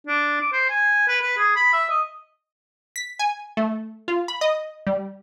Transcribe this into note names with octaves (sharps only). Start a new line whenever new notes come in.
D4
D6
C5
G#5
B4
B4
G#4
B5
E5
D#5
B6
G#5
A3
F4
B5
D#5
G3